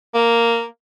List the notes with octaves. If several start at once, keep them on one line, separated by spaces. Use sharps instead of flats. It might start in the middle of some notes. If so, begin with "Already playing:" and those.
A#3